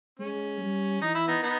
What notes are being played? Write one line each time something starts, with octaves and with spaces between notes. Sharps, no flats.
G#3 C#4
G3
E3 D#4
E4
B3 D#4
B3 D#4